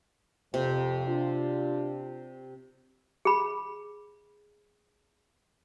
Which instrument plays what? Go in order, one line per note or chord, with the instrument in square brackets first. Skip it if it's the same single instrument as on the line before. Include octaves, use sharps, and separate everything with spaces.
[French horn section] F2 [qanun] C3
[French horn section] D4 F4
[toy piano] G#4 B5